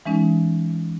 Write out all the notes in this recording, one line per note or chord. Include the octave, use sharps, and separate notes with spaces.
E3 G#3 C#4 D#4